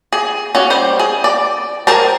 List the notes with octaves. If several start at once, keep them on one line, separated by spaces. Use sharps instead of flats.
G#4
C#4 F#4
G3 C5
G#4
D5
G#4 A#4 C5 A5